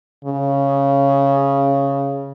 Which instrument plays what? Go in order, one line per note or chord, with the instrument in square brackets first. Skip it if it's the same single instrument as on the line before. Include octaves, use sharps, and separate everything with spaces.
[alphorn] C#3